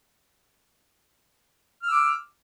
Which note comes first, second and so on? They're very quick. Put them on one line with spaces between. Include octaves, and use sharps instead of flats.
F6 E6 D6